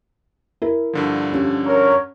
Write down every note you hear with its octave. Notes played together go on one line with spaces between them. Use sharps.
E4 A#4
G2 D3 F3
C#4 G4
A#4 C#5